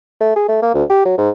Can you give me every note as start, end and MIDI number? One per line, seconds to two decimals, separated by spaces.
0.21 0.32 57
0.36 0.45 68
0.49 0.59 57
0.62 0.74 58
0.74 0.84 38
0.90 1.04 67
1.05 1.15 54
1.18 1.30 44